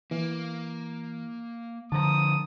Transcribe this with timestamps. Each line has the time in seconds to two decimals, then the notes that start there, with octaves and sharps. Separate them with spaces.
0.11 E3 A#3
1.92 D3 F3 A5 A#5 D#6